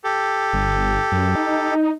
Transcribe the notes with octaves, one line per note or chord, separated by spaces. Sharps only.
G4 A4
G1
F#2
D#4